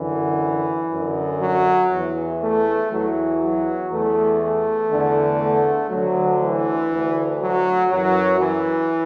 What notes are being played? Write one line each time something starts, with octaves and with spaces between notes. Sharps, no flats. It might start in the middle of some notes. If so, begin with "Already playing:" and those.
Already playing: F#2 D3 E3
F#2 D3
F#3
E2 E3
A3
E2 E3 F#3
F#3
E2 E3 A3
A3
E2 D3
A3
D2 D3 F#3
E3
D2 D3
F#3
F#2 E3 F#3
E3